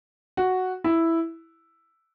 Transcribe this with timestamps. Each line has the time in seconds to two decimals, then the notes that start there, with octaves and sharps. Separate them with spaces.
0.37 F#4
0.84 E4